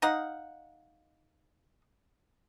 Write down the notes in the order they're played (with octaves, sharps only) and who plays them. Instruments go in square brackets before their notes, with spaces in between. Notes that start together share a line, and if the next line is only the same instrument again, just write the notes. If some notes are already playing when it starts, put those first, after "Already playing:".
[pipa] D#4 D#5 F5 F#5